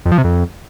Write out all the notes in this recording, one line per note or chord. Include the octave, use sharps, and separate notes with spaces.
F2
F3
C3
F2